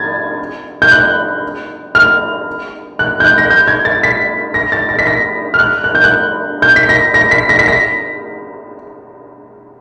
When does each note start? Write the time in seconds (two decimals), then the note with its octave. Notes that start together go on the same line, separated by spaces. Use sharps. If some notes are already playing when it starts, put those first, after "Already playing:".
Already playing: G#6 A6
0.82 G6
0.92 F#6
1.95 F6
2.99 F#6
3.20 G6
3.24 F#6
3.38 A#6
3.50 G6
3.68 G#6
3.85 A6
4.03 B6
4.54 A#6
4.72 A6
4.89 A#6
4.99 B6
5.07 A#6
5.54 F6
5.59 F#6
5.84 F#6
5.95 G6
6.04 F#6
6.62 G6
6.76 B6
6.89 A#6
7.14 A#6
7.31 B6
7.49 A#6
7.59 B6
7.68 A#6